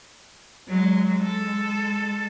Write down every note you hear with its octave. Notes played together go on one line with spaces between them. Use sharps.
F#3 G#3
G#3 A4